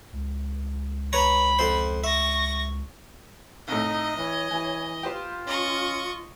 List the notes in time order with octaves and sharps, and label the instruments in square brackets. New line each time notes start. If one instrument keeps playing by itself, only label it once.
[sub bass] C#2
[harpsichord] B4 C#5 A#5 [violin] B5
[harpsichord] F2 C5
[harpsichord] E5 [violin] C#6 A#6
[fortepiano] C2 A2 [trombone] D#4 [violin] D#5
[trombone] E3 [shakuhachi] C#5
[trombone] E3 [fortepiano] G#5
[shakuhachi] F4 [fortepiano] G4 B4 C5
[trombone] C#4 [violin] D#5 C#6